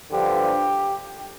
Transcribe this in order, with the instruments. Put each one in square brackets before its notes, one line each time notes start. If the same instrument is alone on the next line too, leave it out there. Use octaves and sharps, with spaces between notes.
[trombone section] G2 D3 F3 G4